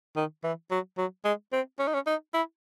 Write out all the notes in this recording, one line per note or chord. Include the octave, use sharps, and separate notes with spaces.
D#3
E3
F#3
F#3
G#3
C4
C#4
D#4
C#4
D#4
E4